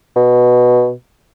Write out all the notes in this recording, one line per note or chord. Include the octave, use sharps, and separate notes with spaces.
B2